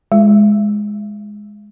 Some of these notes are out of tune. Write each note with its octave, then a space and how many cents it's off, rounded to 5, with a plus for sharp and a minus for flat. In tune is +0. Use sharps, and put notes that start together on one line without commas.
G#3 +0 F4 -5